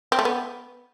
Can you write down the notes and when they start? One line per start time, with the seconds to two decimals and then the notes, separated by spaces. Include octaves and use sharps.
0.12 C4
0.19 A3
0.25 B3